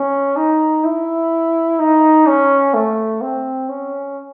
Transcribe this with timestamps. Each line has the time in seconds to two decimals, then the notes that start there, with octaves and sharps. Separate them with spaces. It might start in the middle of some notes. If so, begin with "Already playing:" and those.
Already playing: C#4
0.36 D#4
0.84 E4
1.79 D#4
2.27 C#4
2.74 A3
3.22 C4
3.69 C#4